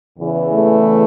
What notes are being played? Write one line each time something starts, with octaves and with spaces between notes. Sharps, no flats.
E2 C#3 E3
A3